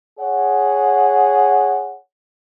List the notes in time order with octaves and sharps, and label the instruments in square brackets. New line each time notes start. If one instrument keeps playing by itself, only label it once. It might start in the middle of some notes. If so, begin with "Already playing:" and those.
[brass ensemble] G#4 C#5 F#5